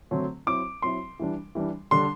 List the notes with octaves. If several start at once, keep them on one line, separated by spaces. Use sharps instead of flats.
D3 F#3 A3 C4
F#3 C4 E4 D6
F#3 C4 E4 C6
E3 G3 D4
E3 G3 D4
D3 G3 D4 C6